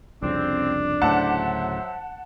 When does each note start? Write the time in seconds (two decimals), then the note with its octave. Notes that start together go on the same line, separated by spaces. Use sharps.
0.22 C2 F2 C#3 C4 D4
1.02 D2 A2 C#3 F#3 C5 E5 F#5 A5